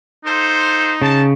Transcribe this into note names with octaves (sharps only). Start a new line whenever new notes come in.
D#4 F4 A4 C5
C#3 A5